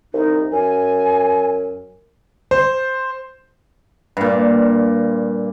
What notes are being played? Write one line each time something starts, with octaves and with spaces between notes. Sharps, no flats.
C2 D#4
F#2 G#5
C5
G2 A#2